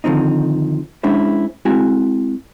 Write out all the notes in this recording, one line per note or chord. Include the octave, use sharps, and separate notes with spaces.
D3 D#3 F3 C4 D#4
G#3 C#4 D4 E4 C5
G#3 C4 E4 F#4 G#5